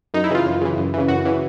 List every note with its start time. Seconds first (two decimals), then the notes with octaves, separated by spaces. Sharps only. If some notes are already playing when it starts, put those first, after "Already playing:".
0.14 F#2 D#4
0.24 E4
0.30 C#3 E3 F4
0.46 F#2
0.61 C#3 E3
0.77 F#2
0.94 C#3 E3
1.08 F#2 F#4
1.25 C#3 E3